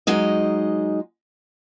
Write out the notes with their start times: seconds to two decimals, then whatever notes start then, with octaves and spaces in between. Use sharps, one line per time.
0.07 F#3 G#3 D#4 D#5